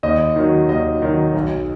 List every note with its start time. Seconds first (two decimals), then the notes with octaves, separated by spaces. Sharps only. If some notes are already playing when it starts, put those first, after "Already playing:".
0.03 D#2 D#5
0.36 D#3 F#3
0.69 D#2 D#5
1.02 D#3 F#3
1.35 B1